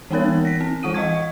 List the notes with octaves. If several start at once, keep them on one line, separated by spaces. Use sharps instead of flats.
E3 A#3 B3 D#4 A#4 C#5
A#6 B6
C4
E3 F4 F#5 D#6 D#7
D#5 F5 C#6 G#6